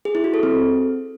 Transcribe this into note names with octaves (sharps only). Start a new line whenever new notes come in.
G#4
E4
F#4
A4
C4